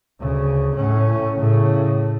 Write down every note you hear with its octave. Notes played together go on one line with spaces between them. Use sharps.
D2 C#3
A2 C#4
A2 C#3